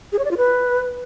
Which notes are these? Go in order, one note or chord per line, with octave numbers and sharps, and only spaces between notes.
G#4
C#5
D5
F4
B4